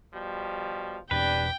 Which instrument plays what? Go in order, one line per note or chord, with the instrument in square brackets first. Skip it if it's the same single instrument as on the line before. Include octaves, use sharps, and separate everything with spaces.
[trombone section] B2 F3 G3
[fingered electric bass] E2 B2 C4 [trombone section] G3 D4 [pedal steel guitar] B4 [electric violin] G5